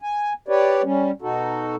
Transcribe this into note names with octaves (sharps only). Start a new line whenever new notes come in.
G#5
G4 B4 C#5 D5
G3 C#4
B2 D#4 F#4 A4